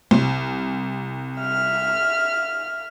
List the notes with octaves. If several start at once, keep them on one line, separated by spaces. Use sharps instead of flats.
C2
E5 F6